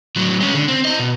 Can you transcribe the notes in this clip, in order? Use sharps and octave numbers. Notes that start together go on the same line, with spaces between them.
A2 F#3
G#3 C#4
D3
C4
E4 D#5
B2